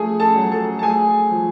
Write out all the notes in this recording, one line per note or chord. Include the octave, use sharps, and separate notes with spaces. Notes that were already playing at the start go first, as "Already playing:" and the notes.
Already playing: F3 A3 G#4 G#5
A4 A5
F#3
A4 A5
A5
A3 G#4 G#5
F3